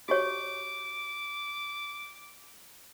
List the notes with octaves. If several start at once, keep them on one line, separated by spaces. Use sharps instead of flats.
F#4 G4 C#5 D6